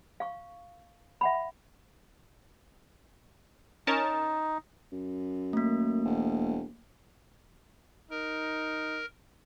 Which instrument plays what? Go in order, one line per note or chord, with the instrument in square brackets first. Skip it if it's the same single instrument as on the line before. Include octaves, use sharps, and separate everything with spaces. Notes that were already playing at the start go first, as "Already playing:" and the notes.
[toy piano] F5 C#6
E5 F#5 B5
[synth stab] C#4 A#4 A5 [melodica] D#4
[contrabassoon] F#2
[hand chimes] A3 A#3
[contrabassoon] E1
[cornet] D#4 [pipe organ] A#4